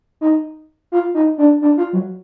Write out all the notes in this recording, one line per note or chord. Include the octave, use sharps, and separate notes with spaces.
D#4
F4
D#4
D4
D4
F4
F#3